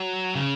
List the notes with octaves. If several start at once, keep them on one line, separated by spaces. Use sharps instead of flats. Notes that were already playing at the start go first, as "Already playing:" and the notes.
Already playing: F#3
C#3